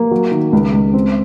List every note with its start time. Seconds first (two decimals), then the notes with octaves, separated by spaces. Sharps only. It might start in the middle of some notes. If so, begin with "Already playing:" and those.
Already playing: A#3
0.11 F#3
0.32 D#3
0.53 C#2
0.73 C#2
0.94 C4